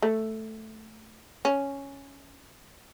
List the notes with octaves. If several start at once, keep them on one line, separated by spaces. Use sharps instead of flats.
A3
C#4